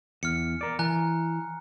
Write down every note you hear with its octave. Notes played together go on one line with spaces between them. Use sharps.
E2 F6 C#7
A#4 D5
E3 G#5 A#5 F#6